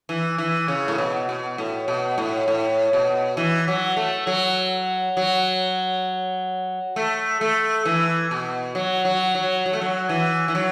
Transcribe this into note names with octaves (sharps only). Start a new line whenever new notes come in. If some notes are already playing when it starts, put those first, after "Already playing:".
E3
E3
C#3
A2
B2
B2
A2
B2
A2
A2
B2
E3
F#3
A3
F#3
F#3
A3
A3
E3
B2
F#3
F#3
F#3
F#3
A3
F#3
E3
E3
F#3